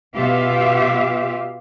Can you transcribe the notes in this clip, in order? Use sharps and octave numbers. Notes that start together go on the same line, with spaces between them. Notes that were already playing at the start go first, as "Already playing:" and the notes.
B2 B3 F4 G4 E5 F5